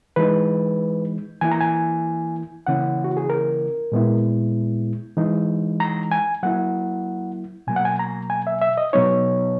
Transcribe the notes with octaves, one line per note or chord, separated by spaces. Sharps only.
E3 G#3 D#4 B4
E3 A#3 E4 G#5
A#5
G#5
C#3 E3 A#3 C#4 E4 F#5
F#4
G#4
A#4
A#2 G#3 B3 E4
E3 G#3 D#4
A#5
G#5
F#3 A#3 E4 F#5
B2 F#3 A#3 G#5
F#5
G#5
A#5
G#5
E5
E5
D#5
B2 F#3 B3 D#4 C#5